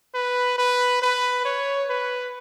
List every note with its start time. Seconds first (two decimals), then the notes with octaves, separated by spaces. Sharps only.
0.14 B4
0.58 B4
1.02 B4
1.45 C#5
1.89 B4